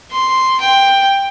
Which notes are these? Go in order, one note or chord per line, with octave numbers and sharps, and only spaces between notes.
C6
G5